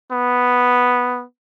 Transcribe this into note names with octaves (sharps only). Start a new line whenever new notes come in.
B3